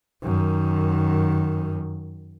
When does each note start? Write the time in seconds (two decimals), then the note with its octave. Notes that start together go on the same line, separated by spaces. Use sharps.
0.23 F#2 D#3